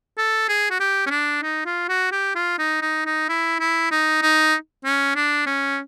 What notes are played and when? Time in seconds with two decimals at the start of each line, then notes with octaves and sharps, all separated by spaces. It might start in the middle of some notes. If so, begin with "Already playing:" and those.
0.18 A4
0.49 G#4
0.70 F#4
0.80 G4
1.06 C#4
1.10 D4
1.42 D#4
1.65 F4
1.89 F#4
2.12 G4
2.35 F4
2.58 D#4
2.82 D#4
3.05 D#4
3.29 E4
3.60 E4
3.91 D#4
4.22 D#4
4.85 C#4
5.15 D4
5.46 C#4